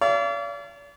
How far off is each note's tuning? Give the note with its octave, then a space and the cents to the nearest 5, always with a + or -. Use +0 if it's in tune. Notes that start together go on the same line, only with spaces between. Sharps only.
D5 -40 F5 -40